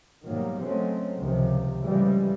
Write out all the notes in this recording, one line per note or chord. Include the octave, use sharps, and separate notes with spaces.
G#2 B2 D#3 F#3 G3 A#3
F#3 G#3 A3 C4 C#4
C#2 C3 D#3 F3
A2 C#3 E3 F3 G3 G#3